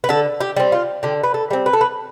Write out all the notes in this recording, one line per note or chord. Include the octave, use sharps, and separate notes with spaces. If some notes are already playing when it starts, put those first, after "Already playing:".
B4
D3 A4
G4
G3 C4
F4
D3 G4
B4
A4
G3 C4
B4
A4
B4